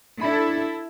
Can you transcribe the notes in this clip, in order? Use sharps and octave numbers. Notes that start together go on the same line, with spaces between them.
D4 E4 A4 B5